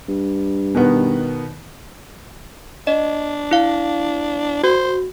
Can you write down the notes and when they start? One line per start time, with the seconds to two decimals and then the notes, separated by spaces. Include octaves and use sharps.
0.09 G2
0.75 B2 D#3 B3
2.87 D4 D#5
3.51 E4 F5
4.64 F#4 C5